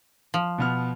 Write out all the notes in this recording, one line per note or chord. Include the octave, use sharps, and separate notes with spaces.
F3
B2 B3 F6